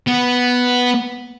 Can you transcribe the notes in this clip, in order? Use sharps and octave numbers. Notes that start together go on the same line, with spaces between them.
B3